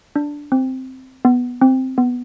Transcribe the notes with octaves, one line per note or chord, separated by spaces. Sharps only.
D4
C4
B3
C4
B3